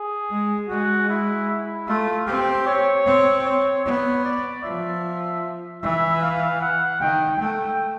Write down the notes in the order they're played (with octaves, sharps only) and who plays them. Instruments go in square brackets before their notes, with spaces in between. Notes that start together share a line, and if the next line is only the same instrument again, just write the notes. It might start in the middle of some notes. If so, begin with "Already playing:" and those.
Already playing: [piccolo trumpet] G#4
[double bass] G#3
[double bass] G#3 [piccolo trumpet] F#4
[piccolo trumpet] E4
E4
[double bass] A3 [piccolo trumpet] F4
[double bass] C4 [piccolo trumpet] G4
[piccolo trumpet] C#5
[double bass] C4
[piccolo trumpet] C#5
[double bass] B3 [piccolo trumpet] C#5
[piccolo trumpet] D5
[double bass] F3 [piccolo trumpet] E5
[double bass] E3 [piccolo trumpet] E5
[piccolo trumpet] F5
F#5
[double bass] D#3 [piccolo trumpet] G5
[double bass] A3 [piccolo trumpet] G5